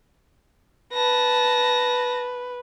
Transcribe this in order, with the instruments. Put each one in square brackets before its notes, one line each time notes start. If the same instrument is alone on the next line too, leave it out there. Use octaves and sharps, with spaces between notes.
[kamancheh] B4 [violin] A5 A#6